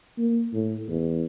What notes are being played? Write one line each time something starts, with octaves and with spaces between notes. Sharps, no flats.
A#3
A2
E2